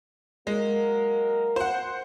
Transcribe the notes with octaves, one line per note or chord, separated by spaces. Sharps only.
F#3 G#3 A#3 A#4
C5 F#5